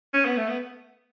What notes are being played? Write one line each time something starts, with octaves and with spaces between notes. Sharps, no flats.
C#4
B3
A3
B3